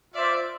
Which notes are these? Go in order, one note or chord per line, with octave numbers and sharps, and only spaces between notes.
F4 C5 D5 E5